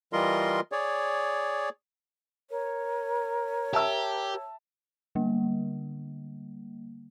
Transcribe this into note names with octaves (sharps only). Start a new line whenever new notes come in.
E3 G3 F4 A#4 D#5 C6
G#4 C#5 D5
A#4 C#5
G4 E5 A5 E6
D3 G3 A#3